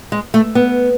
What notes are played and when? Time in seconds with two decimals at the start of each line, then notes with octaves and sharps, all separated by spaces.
0.12 G#3
0.34 A3
0.55 B3